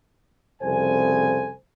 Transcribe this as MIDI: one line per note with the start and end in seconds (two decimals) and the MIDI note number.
0.62 1.52 36
0.62 1.52 41
0.62 1.52 49
0.62 1.52 69
0.62 1.52 72
0.62 1.52 80